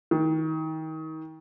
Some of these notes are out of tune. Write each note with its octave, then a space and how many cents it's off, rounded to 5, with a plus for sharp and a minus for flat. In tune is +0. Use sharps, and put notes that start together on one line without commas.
D#3 +30